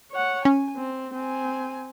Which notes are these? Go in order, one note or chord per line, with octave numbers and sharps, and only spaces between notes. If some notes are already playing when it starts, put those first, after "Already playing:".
C#5 F#5
C#4 G#5
C4
C4 G#5